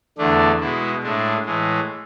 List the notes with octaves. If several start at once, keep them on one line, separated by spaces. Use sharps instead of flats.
E2 D3 A3 D4
B2 G#3 E4
A2 G#3 D4
A2 E3 G#3